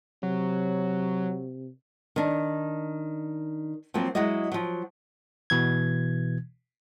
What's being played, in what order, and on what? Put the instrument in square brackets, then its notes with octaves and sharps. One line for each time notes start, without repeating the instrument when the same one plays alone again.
[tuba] C3 [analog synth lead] F#3
[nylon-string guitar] D#3 D4
F3 F#3 A#3 C4
F#3 G#3 E4 F#4 D#5
F3 F#3
[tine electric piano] B2 E3 G#6